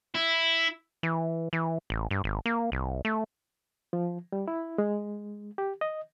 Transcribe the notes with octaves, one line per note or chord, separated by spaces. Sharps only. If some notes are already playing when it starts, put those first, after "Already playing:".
E4
E3
E3
A1
G2
G#1
A#3
C2
A3
F3
G3
E4
G#3
G4
D#5